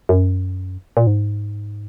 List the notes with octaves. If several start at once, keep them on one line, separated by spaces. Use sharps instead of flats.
F#2
A#2
G#2